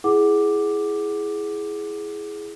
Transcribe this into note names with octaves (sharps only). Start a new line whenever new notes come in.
E4 G#4 F#5 D6